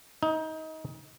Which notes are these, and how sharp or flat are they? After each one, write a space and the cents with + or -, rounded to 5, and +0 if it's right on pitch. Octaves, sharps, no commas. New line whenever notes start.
D#4 +25